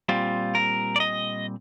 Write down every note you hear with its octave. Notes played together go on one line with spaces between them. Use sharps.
A#2 G3 C4 F4
A#4
D5
D#5